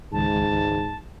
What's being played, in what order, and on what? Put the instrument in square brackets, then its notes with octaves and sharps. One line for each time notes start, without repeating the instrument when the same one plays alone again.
[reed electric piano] C#2 D#3 G#3 [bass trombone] G#2 [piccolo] A5